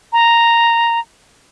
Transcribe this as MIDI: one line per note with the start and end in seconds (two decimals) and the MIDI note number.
0.13 1.00 82